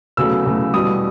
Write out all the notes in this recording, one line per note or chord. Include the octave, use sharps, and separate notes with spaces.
E2 C#3 F#3 A3 E6
E2 C#3 F#3 A3
E2 B2 G3 D#6